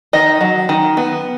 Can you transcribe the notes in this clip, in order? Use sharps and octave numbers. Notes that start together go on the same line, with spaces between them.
D#3 D#5
F#3
D#3
B3